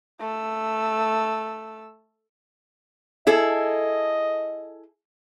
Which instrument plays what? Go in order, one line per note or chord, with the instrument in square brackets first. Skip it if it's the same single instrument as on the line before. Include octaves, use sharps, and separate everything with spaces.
[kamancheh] A3 E6
[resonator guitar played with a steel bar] E4 G#4 A4 [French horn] D#5